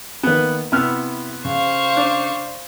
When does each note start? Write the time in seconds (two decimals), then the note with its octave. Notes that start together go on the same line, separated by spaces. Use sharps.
0.23 D#3 A#3 B3 B4
0.72 C3 B3 E4 E6 F6
1.45 C#3 C5 F5 C#6
1.97 D4